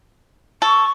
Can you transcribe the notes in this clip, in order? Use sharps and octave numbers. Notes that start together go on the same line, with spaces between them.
A4 C#6